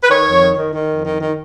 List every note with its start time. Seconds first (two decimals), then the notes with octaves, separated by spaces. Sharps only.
0.04 B4
0.09 D#3 C#5
0.25 F2
0.42 D#3
0.57 D#3
0.73 D#3
0.89 F2
1.05 D#3
1.21 D#3